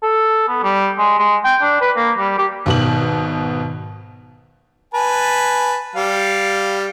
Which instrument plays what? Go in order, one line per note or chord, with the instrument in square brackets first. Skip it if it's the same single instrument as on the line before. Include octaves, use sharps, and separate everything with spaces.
[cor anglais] A4
B3
G3
G#3
G#3
G5
D4
B4
A#3
G3
G4
[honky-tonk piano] G#1 B2 F#7
[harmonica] B4 G#5 A5
G3 F5